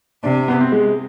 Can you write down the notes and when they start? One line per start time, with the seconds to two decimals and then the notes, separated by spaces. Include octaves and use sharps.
0.24 C3 D4
0.48 B3
0.61 C4
0.72 G#3